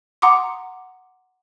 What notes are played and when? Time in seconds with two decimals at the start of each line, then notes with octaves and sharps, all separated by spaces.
0.22 F#5 A#5 C6 D6 D#6